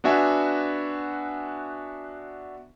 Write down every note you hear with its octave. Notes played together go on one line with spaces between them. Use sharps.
B3 D4 F#4 E5 G#5